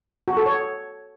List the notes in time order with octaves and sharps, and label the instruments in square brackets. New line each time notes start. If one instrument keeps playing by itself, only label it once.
[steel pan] F#4
A4
C#5